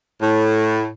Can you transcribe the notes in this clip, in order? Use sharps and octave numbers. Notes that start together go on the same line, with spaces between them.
A2